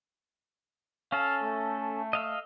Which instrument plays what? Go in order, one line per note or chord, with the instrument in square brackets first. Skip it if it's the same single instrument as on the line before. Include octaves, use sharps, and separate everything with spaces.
[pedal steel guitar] C#4 A4 [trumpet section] F5
[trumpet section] A3
[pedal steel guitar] D#5 F5 E6